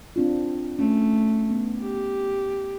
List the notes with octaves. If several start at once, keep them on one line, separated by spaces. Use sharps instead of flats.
C4 D4 F4
A3 C#4
B3
G4